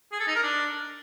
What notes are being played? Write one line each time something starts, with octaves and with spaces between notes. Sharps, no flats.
G#4
A4
D#4
A#4
D4